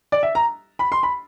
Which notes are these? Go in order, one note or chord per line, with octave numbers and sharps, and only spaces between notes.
D5
E5
A#5
B5
C6
B5